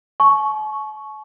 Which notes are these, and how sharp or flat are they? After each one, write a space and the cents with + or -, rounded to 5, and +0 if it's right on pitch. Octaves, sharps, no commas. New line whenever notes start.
A5 -45 C#6 +0